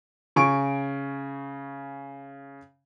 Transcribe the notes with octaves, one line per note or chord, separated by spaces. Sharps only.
C#3 G#5 C#6 D7